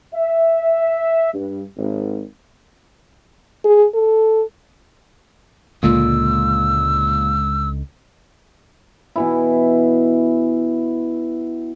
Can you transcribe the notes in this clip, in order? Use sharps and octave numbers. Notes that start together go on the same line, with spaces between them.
E5
G2
G#1
G#4
A4
C#2 A#2 D3 G#3 E6
B2 E3 E4